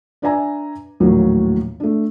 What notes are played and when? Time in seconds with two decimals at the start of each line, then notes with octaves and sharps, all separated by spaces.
0.22 D4 B4 D5 E5 G#5 A#5
1.00 A#1 D#2 A2 F#3 A#3
1.80 A3 D4